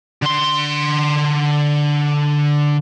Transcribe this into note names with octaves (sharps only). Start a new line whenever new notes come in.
D3 C6